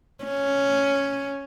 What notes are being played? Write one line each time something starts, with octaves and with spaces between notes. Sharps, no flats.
C#4